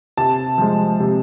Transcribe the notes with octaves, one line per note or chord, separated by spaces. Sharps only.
C3 A5
F3 G#3
C3